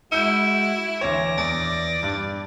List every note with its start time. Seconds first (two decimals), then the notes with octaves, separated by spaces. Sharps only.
0.12 G#3 E4 F#4 E6 G6
1.01 D2 E3 C#5 D6 A#6
1.38 E2 D5
2.03 G2